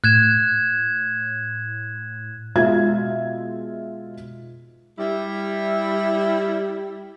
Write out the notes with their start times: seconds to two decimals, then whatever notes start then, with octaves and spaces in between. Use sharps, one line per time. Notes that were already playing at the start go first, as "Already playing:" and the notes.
0.04 A2 F#6 G#6 E7
2.55 B2 G#3 F4 E5 G#6
4.99 G3 E4